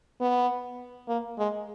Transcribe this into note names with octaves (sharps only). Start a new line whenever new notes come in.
B3
A#3
G#3